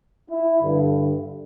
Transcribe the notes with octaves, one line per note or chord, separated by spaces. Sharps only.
E4
G2 D3